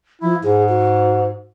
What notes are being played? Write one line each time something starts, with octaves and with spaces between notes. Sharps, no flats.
F3 E4
G#2 G#4
F#4